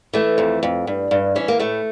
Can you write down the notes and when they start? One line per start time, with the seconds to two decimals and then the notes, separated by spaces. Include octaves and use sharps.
0.13 E3 A3
0.38 F2
0.63 F2
0.87 G2
1.11 G2
1.36 E3 C#4
1.48 A#3
1.60 A2 A3